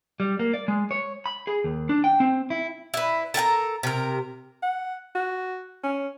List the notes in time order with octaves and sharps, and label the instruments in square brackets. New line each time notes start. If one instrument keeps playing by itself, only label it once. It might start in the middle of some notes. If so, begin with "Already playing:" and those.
[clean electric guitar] G3
A#3
D5
G#3
C#5
B5
G#4
D#2
D4
G5
C4
E4
[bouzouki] E4 B4
A4 A#4 G5 A#5
C3 A#4
[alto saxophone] F#5
F#4
C#4